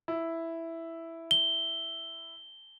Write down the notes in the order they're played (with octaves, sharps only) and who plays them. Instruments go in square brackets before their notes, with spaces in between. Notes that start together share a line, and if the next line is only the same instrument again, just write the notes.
[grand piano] E4
[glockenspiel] G7